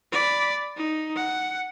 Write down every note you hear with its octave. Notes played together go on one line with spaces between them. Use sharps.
D5 B5
D#4
F#5